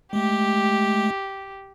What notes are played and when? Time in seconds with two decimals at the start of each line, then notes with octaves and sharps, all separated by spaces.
0.13 G#3 A3 G4